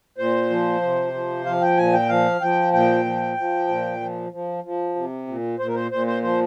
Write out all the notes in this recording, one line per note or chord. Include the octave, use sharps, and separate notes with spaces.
A#2 C5
F3
C3
F3
F3 F5
G5
A#2 G#5
G5
F3 F5
F3 G5
A#2 G5
F3
F3
A#2
F3
F3
F3
C3
A#2
A#2 C5
A#4
C5
A#2 C5
C5
F3 C5